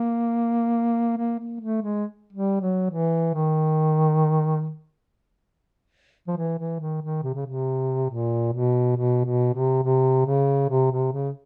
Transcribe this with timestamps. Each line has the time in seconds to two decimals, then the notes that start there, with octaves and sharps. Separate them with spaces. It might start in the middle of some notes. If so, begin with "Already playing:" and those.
Already playing: A#3
1.17 A#3
1.39 A#3
1.61 A3
1.82 G#3
2.33 G3
2.61 F#3
2.90 E3
3.34 D#3
6.28 F3
6.37 E3
6.58 E3
6.80 D#3
7.02 D#3
7.23 C3
7.34 C#3
7.46 C3
8.10 A#2
8.53 B2
8.96 B2
9.25 B2
9.54 C3
9.83 C3
10.26 C#3
10.69 C3
10.92 C3
11.13 C#3